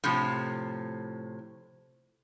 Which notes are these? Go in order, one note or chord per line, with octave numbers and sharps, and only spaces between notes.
A2 C3 F3